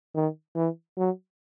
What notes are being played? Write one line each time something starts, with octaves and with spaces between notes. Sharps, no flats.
D#3
E3
F#3